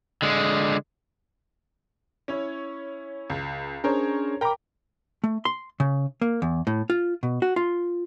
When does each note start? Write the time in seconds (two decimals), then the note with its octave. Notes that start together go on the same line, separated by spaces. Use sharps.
0.22 D3 G#3
2.28 C#4 E4 C#5
3.30 C#2
3.84 C#4 D4 G#4 A#4 C5 C#5
4.41 A#4 G5 A#5 B5 D6
5.24 A3
5.45 C6
5.80 C#3
6.21 A#3
6.42 E2
6.67 A2
6.90 F4
7.23 B2
7.42 F#4
7.56 F4